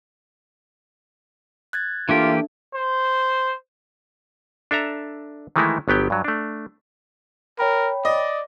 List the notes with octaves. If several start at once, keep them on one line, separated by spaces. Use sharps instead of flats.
F#6 G#6 A6
E3 A3 A#3 D4 F4 G4
C5
D4 A4 E5 A#5
D#3 E3 G#3 A3 D#4 E4
G1 F#3 B3 G4 G5
G2 F#3
A3 D4
A#4 C#5 G5 B5
D5 D#5